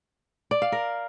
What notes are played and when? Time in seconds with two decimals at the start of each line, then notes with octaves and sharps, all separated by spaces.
0.51 D5
0.62 F5
0.72 A#4